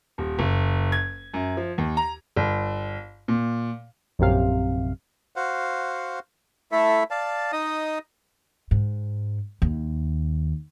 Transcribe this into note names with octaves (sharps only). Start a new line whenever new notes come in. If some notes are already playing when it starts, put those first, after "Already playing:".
D#1
F#1
G#6
F#2
F3
D#2
A#5
G1
A#2
A#1 F#2 C3 F5
F#4 C5 F5 F#5
A3 E4 A4 E5
D5 F5 A5
D#4 D#5 D#6
G#2
D#2